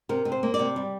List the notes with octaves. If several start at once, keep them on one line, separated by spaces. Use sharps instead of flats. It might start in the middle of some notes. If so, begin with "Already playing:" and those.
C3 A#4
C3
C5
A#3
D5
C3
G3